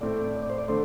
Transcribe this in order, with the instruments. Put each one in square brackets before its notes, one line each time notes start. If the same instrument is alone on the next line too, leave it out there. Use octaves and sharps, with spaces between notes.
[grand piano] A2 A3 C4 [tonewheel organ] D5
[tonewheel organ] D5
C5
D5
[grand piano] D3 A3 [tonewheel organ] C5